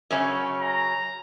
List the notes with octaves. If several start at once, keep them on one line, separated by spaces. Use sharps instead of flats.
F#2 C#3 C#4
A#5